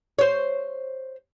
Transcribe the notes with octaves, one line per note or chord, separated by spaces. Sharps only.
C5 C#5